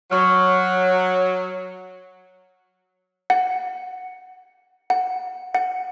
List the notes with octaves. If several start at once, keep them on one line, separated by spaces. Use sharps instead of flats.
F#3 C#5 C#6 F6
F#5
F#5
F#5